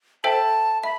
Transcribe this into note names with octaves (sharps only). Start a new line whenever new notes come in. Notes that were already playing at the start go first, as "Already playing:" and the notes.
A4 C5 E5 G5 A5
E5 B5